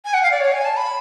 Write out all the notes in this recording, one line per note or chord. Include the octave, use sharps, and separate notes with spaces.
G#5
F#5
F5
D5
C#5
G#5
A5
B5